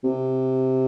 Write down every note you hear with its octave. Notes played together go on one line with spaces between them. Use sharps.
C3